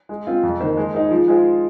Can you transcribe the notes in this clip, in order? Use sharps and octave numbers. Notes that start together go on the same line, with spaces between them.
G#3
C4 F4
F2
D#3 A#3 D#4 C5
G#3
D#4 G#4 C5
F3
G#3 F4 G#4 C5